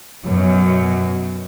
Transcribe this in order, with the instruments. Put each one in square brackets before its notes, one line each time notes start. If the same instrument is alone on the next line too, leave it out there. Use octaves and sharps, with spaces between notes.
[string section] F#2 B2 F#3